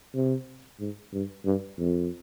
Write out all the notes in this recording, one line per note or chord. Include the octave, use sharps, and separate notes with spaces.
C3
G#2
G2
G2
F2